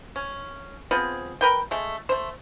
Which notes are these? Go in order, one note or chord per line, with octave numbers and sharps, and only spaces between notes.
C#4
F3 B3 C4 G#4
A#4 B4 G5
G#3 A3
A3 C5